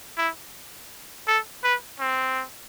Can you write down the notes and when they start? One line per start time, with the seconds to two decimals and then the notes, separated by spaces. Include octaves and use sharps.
0.17 E4
1.27 A4
1.63 B4
2.00 C4